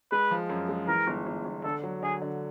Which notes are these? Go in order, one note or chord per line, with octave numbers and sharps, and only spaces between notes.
G#3 B4
F3
F#2
G#3
E3 A#4
G1
G1
G1
D3 A4
F#3
D3 G#4
D3